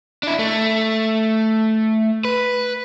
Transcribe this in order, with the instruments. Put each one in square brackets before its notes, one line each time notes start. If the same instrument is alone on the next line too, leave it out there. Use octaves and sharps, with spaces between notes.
[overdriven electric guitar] D4 E4
A3
B4